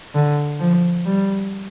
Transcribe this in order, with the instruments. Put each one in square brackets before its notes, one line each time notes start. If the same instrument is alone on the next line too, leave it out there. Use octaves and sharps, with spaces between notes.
[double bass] D3
F3
G3